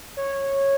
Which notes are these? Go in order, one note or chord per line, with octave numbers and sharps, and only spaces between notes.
C#5